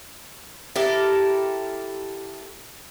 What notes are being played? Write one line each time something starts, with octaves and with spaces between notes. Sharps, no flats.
E4 G4 A4 A#4